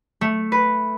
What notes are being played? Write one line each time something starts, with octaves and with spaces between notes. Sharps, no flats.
A3
B4